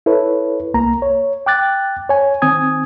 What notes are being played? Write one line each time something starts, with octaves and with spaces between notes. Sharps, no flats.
E4 A4 B4 C#5
C2 A#3 A#5
C#5
G5 D6 F#6 A6
C#5 G#5
D#3 C4 G#5 D#6 G#6